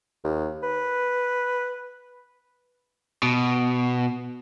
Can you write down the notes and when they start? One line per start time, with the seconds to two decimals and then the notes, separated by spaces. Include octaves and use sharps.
0.24 D#2
0.63 B4
3.23 B2